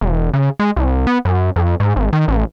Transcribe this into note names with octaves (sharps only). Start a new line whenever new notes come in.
E1
C#3
G#3
C2
B3
F#2
F2
G#2
G#1
D#3
A1